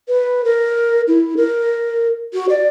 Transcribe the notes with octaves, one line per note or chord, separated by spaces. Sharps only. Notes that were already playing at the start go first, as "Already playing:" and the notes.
B4
A#4
E4
A#4
F#4
D5